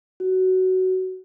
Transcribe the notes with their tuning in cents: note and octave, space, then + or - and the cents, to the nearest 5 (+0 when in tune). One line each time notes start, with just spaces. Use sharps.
F#4 +15